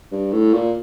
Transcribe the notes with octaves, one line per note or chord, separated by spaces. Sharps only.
G2
A2
A#2